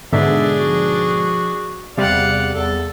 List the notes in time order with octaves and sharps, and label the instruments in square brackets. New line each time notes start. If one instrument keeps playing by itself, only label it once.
[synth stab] G#2 B2 D3 [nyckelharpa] D4 G#4 [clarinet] E5
[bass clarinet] F3 [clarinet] F#4
[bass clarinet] E2 [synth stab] C3 G3 [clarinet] D5 [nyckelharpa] F5 F#5
[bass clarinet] E2 [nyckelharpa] A4